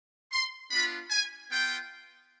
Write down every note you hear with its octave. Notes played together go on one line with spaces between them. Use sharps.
C6
B3 D4 F4 B5
G#5
B3 F4 G5